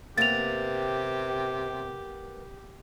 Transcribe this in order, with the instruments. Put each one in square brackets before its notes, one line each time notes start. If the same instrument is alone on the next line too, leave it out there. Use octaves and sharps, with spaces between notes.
[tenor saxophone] C3 [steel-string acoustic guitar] A#3 B3 [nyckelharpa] G4 [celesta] A6 F7